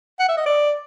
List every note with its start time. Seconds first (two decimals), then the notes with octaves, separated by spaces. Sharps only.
0.20 F#5
0.29 E5
0.37 D#5
0.46 D5